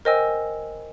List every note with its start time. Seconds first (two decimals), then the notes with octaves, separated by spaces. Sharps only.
0.05 A#4 C5 D#5 G5 G#5 E6